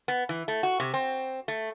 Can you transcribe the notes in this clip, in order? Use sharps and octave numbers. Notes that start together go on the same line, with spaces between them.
B3
E3
A3
F#4
C3
C4
A3